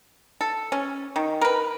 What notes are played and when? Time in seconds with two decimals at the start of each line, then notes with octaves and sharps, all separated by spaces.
0.41 A4
0.72 C#4
1.16 D#3
1.41 A#4 B4